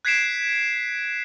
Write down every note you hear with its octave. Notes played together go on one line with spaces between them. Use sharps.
F#6 G#6 B6 C7 D7 E7